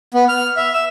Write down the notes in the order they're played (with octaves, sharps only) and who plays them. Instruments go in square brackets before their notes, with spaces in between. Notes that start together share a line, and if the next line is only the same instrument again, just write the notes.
[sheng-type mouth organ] B3
F6
E5
E6